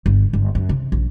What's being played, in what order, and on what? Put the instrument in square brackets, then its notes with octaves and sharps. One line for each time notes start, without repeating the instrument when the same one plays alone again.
[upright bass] G1
G1
F#2
C3
A#1